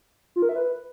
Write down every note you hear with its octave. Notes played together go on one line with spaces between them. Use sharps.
F4
A#4
E5
B4